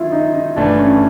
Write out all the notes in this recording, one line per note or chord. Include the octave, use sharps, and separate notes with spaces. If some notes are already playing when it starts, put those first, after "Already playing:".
Already playing: D#3 F#3 B3 D4 E4 F4
D#4
D#4
G1 G2 E3 A3 D4
C#4